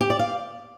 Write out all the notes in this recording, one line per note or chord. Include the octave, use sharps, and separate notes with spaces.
G4
D5
F5